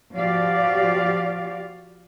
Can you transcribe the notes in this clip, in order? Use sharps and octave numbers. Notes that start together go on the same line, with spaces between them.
F3 F#4 G4 D5 F5